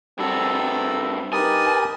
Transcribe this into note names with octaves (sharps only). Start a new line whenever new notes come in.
G2 C4 F#4 A4 B5 E6
D#4 G4 A#4 B4 G#5 B5 D#6 A6